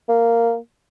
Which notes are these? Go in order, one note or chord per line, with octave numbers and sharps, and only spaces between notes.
A#3